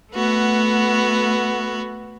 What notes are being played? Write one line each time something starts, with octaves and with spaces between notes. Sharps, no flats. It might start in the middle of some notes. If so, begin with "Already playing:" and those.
A3 B3 F#4